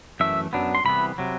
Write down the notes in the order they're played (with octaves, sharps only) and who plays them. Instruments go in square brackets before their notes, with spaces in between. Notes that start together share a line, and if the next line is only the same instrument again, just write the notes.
[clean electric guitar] F#2 E3 A3 E5
F#2 F#3 B3 D4
C6
C2 C3 E3 B3 B5
C3 F#3